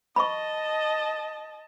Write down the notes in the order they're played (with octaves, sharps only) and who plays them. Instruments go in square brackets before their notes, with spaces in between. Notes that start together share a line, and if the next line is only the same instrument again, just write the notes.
[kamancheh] D#5 A5 [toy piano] B5 C#6